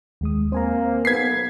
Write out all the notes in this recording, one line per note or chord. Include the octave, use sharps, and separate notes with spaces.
D#2 G#3 D#6
A#3 C4 C5 G#5 A#5
B1 B3 G#6 B6 C7